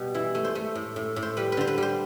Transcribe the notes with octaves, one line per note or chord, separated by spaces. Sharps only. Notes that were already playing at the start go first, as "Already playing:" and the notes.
Already playing: B2 G3 G4
E3 E4
A3
C5
A3
A2
A2
A2
C5
G3 B4
B4
D3 C5
B4
G3 C5